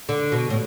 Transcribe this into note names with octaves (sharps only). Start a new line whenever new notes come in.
D3
B2
A2